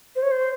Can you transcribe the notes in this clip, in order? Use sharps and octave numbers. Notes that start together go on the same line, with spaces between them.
C5
C#5
C5